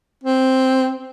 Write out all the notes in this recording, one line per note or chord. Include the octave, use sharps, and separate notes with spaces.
C4